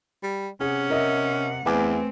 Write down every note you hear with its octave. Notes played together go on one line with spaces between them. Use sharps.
G3
C3 C#4 G#4 F#5
A#4 D#5 E5
E2 A3 C4 B4 G#5 D6